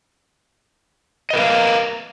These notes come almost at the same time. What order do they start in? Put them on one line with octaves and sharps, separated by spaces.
D#5 B4 A#4 F5